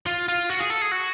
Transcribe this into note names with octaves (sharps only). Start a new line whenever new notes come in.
F4
F4
F#4
G#4
A4
G#4
F#4